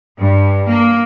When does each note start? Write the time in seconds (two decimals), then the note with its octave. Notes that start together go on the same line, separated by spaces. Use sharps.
0.18 G2
0.69 A#3